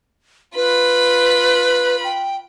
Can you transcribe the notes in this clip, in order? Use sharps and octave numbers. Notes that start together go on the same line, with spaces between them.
F4 B4 B5
G5